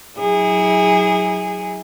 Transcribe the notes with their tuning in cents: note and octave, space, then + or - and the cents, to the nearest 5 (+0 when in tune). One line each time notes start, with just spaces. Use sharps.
F#3 +0 E4 -40 G#4 -20